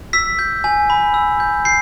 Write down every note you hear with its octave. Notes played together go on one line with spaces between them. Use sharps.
E6 B6
G6
G#5
B5
E6
G6
G6 C7